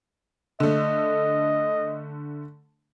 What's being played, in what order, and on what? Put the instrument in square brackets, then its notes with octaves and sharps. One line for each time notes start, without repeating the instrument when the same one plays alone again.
[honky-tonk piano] D3 A3 [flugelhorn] D#5